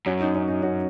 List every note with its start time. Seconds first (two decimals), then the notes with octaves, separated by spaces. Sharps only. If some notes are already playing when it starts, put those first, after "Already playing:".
0.06 F#2 C#4 F#4
0.20 D#4
0.35 C#4
0.48 D#4
0.62 C#4 F#4